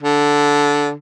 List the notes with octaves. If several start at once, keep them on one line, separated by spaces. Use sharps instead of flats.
D3